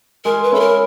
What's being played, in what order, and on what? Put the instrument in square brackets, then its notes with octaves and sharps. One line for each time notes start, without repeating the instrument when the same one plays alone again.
[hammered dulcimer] G#3 [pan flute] A#4
[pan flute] B4
[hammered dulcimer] C#4 E4 [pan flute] A4
[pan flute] A#4